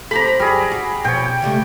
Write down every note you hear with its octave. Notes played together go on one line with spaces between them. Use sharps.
C4 G4 A4 A#5 B5
F#2 G3 G#4
F#4
F2 B2 C#5 G5
C#3 G3 A3